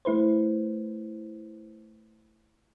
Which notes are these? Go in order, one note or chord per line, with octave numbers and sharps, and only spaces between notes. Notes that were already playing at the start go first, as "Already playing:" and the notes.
A3 E4 B4 C5